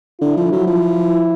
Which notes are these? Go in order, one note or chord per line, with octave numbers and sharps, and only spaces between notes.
D3 E4
F3
F#3
F3